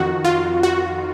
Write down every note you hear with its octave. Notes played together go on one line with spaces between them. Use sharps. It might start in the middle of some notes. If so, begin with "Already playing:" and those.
Already playing: F2 D#3 F#4
F4
F#4